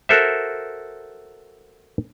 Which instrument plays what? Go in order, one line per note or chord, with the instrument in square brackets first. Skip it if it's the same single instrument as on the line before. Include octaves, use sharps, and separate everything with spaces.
[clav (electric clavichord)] F#4 A4 A#4 C5 E5